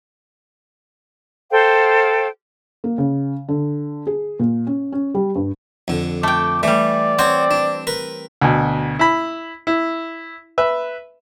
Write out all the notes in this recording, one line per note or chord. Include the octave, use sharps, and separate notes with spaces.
A4 C5 F5 G5
A#3
C#3
D3
G#4
A#2
C#4
C#4
G3
G2
F2 D3
A3 G5 D6
E3 G3 A3 D5
C4 C5 C#5 F#5
D4
A#4 B4
D2 B2
E4 B5
E4
B4 E5